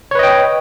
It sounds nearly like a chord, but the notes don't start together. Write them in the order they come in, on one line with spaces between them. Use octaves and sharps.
C#5 B4 D#5 G5